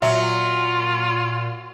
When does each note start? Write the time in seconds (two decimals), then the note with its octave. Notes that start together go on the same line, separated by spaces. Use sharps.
0.02 A#2 F#3 F4 E5